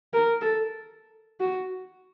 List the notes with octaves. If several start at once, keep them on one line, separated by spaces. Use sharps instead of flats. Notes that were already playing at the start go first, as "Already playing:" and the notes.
A#4
A4
F#4